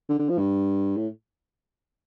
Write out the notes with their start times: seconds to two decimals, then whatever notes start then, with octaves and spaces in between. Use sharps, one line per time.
0.09 D3
0.19 D3
0.29 F3
0.38 G2
0.97 A2